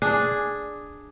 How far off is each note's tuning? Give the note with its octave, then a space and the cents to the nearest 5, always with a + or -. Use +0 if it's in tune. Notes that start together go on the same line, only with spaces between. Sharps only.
D4 +0 G#4 +0